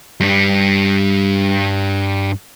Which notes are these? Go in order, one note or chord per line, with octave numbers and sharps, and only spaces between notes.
G2 G3